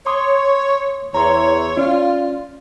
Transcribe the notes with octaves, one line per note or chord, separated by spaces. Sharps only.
C#5 C6 D6 D#6
E2 C#5 A#5 C6
C#4 F4 D5